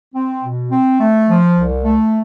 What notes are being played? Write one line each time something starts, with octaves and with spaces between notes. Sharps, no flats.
C4
B2
C4
A3
F3
C2
A3